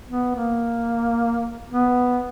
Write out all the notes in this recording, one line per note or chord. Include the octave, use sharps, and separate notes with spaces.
B3
A#3
B3